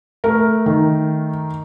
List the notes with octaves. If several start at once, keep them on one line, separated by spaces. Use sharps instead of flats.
A3 A#4
D#3